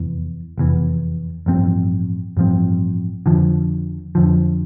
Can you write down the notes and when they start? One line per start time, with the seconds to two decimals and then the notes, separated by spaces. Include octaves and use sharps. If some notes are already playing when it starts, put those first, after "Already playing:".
Already playing: F1 E2 E3
0.58 F1 E2 E3
1.46 A1 G2 F3 C4
2.37 A1 G2 F3 C4
3.26 F2 D3 F3
4.15 F2 D3 F3